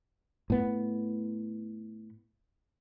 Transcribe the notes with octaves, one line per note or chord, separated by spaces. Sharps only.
A2 B3